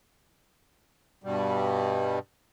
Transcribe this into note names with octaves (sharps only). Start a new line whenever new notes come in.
G2 B2 G3